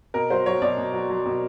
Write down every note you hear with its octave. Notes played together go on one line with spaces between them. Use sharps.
B2 A#4
F#3 C5
F#3 C#5
B2 D5
B2
F#3
F#3
B2